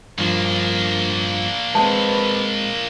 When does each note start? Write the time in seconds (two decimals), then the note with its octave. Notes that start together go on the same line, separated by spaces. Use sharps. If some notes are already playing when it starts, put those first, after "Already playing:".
0.18 G2 F3 A#3 D4
1.75 G#3 C4 B4 A5